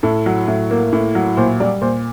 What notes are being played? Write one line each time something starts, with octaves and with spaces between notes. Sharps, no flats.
A2 A4
F#3
A2
A#3
A2
F#3
A#2 C5
G3 D5
A#2 C5